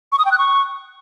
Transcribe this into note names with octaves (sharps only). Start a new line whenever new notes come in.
C#6
D#6
G5
F#6
C#6